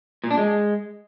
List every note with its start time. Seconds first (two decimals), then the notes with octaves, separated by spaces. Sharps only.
0.24 A#2
0.31 D4
0.37 G#3